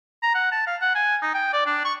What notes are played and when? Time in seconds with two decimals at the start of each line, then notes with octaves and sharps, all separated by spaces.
0.23 A#5
0.34 F#5
0.52 A5
0.67 F5
0.81 F#5
0.95 G#5
1.22 D#4
1.34 G5
1.53 D5
1.66 D4
1.85 C#6